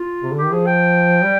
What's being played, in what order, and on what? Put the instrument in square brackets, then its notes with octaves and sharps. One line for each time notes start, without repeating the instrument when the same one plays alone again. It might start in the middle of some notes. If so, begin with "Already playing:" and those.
Already playing: [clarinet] F4
[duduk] C3
D3
[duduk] D#3 [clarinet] G4
[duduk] F3 [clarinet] G#4
[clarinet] G5
[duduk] G3